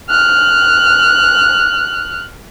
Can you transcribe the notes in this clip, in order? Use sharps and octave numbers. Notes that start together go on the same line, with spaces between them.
F6 F#6